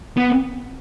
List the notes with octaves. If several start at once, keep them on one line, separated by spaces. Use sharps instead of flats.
B3